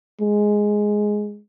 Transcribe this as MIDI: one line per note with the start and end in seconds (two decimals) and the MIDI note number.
0.20 1.40 56